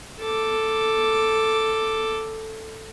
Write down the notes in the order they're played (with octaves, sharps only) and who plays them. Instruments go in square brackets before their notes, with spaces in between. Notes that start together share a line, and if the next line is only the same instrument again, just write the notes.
[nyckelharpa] A4 D6